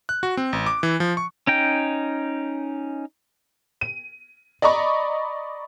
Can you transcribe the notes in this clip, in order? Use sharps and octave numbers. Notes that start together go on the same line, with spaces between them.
F#6
F#4
C4
A1
D6
E3
F3
C#6
C#4 D#4 G5
D#7
D5 D#5 A#5 B5 C#6